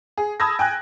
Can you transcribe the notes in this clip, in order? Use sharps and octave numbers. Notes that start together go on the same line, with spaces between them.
G#4
A5 B5 D#6 E6 G#6 A#6
G5 G#5 F#6